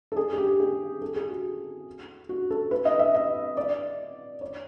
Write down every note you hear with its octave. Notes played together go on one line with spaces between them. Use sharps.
A4
G#4
G#4
G4
G#4
A4
G#4
F#4
F#4
A4
B4
D#5
E5
D#5
D5
C#5